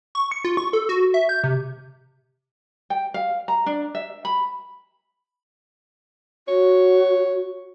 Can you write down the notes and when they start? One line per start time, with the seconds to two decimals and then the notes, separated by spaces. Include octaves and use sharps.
0.15 C#6
0.31 C#7
0.45 F4
0.57 C#6
0.73 A4
0.89 F#4
1.14 E5
1.29 G6
1.44 C3
2.90 G5
3.14 F5
3.48 A#5
3.66 D4
3.95 E5
4.25 B5
6.48 F#4 C#5